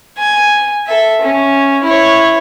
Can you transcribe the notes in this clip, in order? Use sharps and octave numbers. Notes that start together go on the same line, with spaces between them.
G#5
A4 E5
C#4
E4 C#5